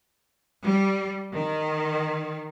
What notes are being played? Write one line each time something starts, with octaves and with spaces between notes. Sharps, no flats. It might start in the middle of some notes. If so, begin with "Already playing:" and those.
G3
D#3